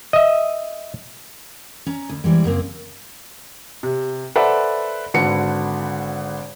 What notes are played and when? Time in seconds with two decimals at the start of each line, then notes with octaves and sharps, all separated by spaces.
0.13 D#5 E5
1.86 C#4 A#5
2.09 D2
2.24 E3 G3 G#3
2.44 F#2 C#3 A#3 C4
3.83 C3
4.36 A4 B4 C5 D5 E5 F#5
5.14 G#1 D3 F#4 B4 C#7